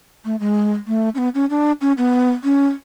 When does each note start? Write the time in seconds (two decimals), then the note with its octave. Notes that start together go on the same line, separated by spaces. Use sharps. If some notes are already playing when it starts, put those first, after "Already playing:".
0.25 A3
0.40 G#3
0.87 A3
1.15 C#4
1.18 B3
1.34 C#4
1.50 D4
1.81 C#4
1.98 B3
2.44 C#4